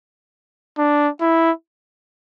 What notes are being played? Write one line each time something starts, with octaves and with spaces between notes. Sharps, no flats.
D4
E4